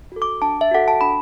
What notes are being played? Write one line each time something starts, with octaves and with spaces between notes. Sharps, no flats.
F#4 A4
D6
D4 A5
E5
F#4 A4 F#5
A5
D4 B5